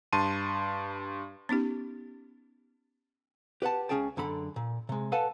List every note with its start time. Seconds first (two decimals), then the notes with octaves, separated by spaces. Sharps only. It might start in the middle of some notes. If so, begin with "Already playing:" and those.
0.13 G2 A5 C6 D#7
1.49 B3 C#4 D#4 G4
3.62 G4 B4 F#5 A5
3.89 C#2 F#2 C#4 G#4 G5 A5
4.17 F#2 D3 A4 B5
4.56 A#2
4.89 C3 G#3
5.12 A4 B4 F5 F#5 G#5 A5